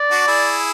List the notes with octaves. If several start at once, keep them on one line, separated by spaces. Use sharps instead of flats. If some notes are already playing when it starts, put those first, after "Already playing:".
Already playing: D5
D4 F#4
E4 G#4